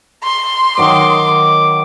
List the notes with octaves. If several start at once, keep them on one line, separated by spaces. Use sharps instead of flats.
C6
D#3 F#3 D#5 D6